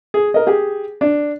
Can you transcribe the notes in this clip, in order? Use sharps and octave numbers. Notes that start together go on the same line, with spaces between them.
G#4
A#4 D#5
G4 G#4
D4